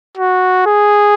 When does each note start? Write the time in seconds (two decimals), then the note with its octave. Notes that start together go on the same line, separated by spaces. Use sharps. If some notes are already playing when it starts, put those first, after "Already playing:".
0.17 F#4
0.66 G#4